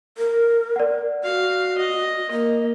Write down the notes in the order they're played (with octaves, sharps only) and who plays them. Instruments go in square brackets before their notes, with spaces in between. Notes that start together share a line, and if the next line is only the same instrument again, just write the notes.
[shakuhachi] A#4
[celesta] D5 F#5
[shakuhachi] F#4 [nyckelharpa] F5
[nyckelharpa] D#5
[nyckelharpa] A#3 [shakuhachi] D#5